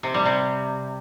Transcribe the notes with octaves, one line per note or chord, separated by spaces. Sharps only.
C3
G3
C3